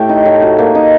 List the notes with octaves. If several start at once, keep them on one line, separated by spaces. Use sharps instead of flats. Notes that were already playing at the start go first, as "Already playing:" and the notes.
Already playing: A2 A3 G4
D#4
A2
F#4
A#3
D#4